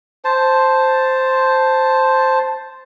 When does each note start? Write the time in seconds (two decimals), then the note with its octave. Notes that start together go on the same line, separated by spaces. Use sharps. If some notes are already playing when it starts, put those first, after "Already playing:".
0.25 C5 A5